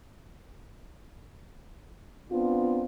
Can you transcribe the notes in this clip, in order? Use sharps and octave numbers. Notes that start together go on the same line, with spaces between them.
B3 C4 D4 F4